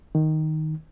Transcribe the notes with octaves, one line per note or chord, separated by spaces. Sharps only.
D#3